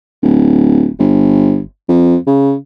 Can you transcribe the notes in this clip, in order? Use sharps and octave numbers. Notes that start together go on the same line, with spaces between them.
D1
G1
F2
C#3